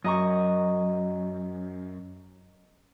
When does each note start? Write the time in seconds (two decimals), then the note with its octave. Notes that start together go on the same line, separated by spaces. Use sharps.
0.04 F#2 D#5 A#5 C#6